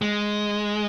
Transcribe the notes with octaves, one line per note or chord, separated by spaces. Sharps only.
G#3